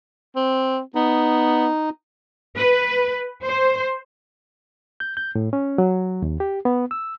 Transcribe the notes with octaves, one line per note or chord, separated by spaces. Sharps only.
C4
B3 D#4
B4
C5
G6
G6
A2
C#4
F#3
D#2
G4
B3
E6